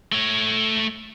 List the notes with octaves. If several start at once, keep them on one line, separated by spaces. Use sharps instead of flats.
A3 C#5